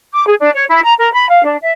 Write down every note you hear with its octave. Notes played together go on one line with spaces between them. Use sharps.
D6
G#4
D4
C#5
E4
A#5
A#4
B5
F5
D4
E5